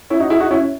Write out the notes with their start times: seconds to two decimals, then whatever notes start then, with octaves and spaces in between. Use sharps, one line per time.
0.10 C#4 E4
0.20 D#4 F#4
0.30 E4 G#4
0.40 D#4 F#4
0.51 C#4 E4